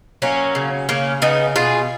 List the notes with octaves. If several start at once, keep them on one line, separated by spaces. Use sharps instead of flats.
F#3 A#3 C#4
C#3
C#3 A#3 C#4
C#3 B3 D#4
B2 F4 G#4